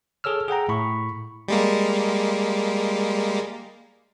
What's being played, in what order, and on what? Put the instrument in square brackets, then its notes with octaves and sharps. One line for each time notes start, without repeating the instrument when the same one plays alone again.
[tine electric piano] G#4 A4 C#5 E6 F6
G#4 F#5 G5 A#5
A2 B5 C#6
[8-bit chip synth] G3 G#3 A#3